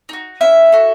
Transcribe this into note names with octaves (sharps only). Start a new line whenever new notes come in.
D#4 F#4
C#4 E4 E5
F#4 A4